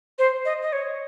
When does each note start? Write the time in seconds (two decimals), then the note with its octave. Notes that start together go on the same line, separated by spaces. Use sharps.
0.19 C5
0.45 D#5
0.62 D#5
0.73 C#5